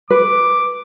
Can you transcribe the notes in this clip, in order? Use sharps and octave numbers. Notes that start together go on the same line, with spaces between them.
B4 D6